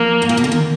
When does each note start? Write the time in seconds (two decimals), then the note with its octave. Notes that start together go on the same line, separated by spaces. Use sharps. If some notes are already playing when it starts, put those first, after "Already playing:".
Already playing: F3 A#3
0.22 G#2
0.29 A#2
0.37 B2
0.44 D3
0.52 D#3